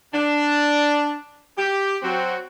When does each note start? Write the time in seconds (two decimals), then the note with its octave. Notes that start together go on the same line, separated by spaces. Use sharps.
0.13 D4
1.58 G4
2.03 F#3 C4 F#4